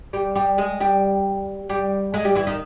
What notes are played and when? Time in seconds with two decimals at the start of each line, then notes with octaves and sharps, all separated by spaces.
0.13 G3 G4
0.35 G3 G4
0.58 G#3 G#4
0.80 G3 G4
1.69 G3 G4
2.14 G#3 G#4
2.25 G3 G4
2.35 E3 E4
2.47 D#3 D#4